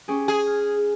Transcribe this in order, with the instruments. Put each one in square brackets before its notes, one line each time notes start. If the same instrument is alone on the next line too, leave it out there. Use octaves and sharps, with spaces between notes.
[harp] C#4 G4 G#4
[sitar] G#4 [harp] G#6
[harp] F6